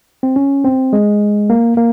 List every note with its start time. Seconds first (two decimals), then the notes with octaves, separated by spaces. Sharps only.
0.23 C4
0.36 C#4
0.65 C4
0.93 G#3
1.50 A#3
1.77 A#3